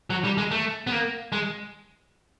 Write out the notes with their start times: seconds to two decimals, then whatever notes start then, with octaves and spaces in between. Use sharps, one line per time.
0.10 F#3
0.24 G3
0.38 G#3
0.51 A3
0.87 B3
0.92 A#3
1.32 G#3